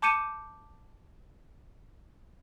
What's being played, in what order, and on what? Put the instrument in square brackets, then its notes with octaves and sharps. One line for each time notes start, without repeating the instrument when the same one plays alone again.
[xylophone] A5 D6 G6 C#7 D#7 E7